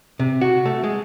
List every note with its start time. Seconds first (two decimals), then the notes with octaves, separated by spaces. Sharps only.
0.19 C3
0.41 F#4
0.66 A3
0.84 G#3